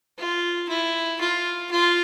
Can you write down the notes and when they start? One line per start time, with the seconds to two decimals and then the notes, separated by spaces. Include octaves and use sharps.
0.18 F4
0.69 E4
1.20 F4
1.71 F4